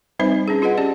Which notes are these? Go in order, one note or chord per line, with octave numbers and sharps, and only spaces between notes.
G3 C4 D#4 B4 C5 E5
C#4 D4 G#4
F4 G#4 B4 D#5 F#5
C#4 G4 D5